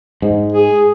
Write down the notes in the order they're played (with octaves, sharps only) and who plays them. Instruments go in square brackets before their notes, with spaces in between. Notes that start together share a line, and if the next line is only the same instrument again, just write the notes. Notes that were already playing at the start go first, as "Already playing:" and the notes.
[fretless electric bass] G#2
[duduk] G#4